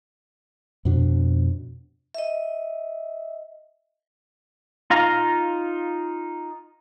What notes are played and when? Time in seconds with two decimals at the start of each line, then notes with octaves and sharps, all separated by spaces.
0.85 F2 B2 D4
2.14 D#5 E5
4.90 D#4 F4 F5 A#5